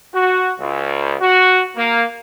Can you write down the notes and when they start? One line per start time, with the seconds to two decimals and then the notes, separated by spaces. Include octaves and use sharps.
0.14 F#4
0.60 C#2
1.21 F#4
1.76 A#3